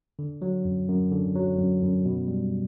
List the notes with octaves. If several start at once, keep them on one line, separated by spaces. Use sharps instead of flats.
D3
F#3
F#2
F#2
D3
F#3
F#2
F#2
B2
G3